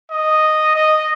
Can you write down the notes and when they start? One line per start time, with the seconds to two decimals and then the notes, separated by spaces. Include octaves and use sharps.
0.11 D#5
0.75 D#5